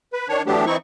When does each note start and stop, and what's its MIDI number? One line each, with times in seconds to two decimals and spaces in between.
0.13 0.28 71
0.29 0.42 51
0.29 0.42 62
0.29 0.42 73
0.47 0.65 52
0.47 0.65 54
0.47 0.65 57
0.47 0.65 59
0.47 0.65 62
0.47 0.65 67
0.66 0.77 52
0.66 0.77 60
0.66 0.77 63
0.66 0.77 64
0.66 0.77 85